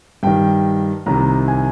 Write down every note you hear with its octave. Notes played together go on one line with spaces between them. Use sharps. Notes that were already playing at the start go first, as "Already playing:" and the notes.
G2 D#3 G5
C2 C3 D#3 A#5
G#5